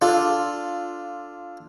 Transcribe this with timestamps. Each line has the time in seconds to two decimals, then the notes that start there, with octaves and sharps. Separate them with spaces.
0.02 D4 F4 A4